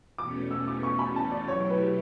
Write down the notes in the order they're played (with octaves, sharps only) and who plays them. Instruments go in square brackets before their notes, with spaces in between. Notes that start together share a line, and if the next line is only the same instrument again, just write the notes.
[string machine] E2 B2 A3 C#4 [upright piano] D6
[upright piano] E6
D6
C#6
B5
A5
D5
[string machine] B2 F#3 A3 E4 G4 [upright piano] C#5
[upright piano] B4